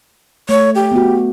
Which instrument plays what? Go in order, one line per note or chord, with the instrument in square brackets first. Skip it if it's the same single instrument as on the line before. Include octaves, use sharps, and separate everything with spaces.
[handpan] A3 [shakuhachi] C#5
[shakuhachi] G4
[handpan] B3 F#4